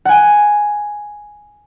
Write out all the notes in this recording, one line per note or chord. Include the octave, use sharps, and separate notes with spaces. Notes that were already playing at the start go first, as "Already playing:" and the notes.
F#5 G#5